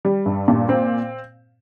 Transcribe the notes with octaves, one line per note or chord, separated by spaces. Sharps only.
G3
G2
A#2
C4